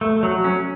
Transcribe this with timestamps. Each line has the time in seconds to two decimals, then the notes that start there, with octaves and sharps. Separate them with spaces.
0.01 A3
0.23 F#3
0.44 C#4